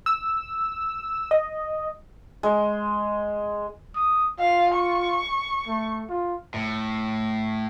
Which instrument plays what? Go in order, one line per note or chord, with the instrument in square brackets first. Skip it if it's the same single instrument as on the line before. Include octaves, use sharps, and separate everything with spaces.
[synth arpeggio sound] E6
D#5
[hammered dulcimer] G#3
[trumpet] D#6
[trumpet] F4 [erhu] F5
[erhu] C#6
[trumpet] A3
F4
[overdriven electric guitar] A2